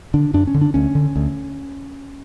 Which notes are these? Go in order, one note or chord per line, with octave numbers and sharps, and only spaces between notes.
D3 D4
F#2 D4
C#4
D3
D4
D2 C#4
D3
D2